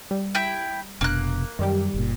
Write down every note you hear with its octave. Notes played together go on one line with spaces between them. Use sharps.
G3
E4 G5
F1 B2 A#3 D4 F#6
F#2 D#3 G3 G4
F#1 A#2